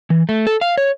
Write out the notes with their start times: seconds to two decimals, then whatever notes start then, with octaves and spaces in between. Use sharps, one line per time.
0.10 E3
0.29 A3
0.47 A4
0.61 F5
0.78 C#5